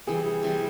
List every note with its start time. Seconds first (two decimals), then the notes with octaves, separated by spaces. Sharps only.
0.07 C3 E3 G3 G#4
0.43 C3 E3 G3